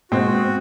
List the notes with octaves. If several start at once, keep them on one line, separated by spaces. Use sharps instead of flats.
B2 G#3 C4 F#4